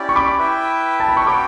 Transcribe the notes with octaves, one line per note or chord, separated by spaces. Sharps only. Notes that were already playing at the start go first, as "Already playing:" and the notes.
Already playing: C#4 E4 G4 D5
C#6
B5 D6
E4 B4 E5 G5
A5
B5
C#6
F#4 A4 C#5 G5 B5 D6